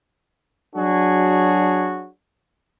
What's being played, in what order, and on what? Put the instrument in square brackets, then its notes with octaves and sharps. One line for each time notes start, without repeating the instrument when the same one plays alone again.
[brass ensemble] F#3 D4 F#4 G#4 C#5